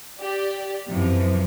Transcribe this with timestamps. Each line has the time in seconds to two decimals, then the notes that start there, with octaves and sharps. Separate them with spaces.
0.20 G4 D5
0.89 F#2 C3 E3 F3